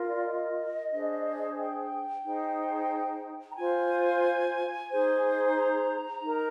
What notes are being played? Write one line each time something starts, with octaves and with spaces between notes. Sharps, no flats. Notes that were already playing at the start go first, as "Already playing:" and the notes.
Already playing: F4 A#4
D5
D#5
D4 G#4 C5
G5
D#4 G#4 C5
A#5
F4 C5 G#5
D#4 G#4 C5
A#5
D#4 A#4